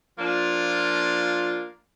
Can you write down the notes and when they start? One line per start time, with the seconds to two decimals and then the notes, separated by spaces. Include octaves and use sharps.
0.18 F3 A#3 D4 F4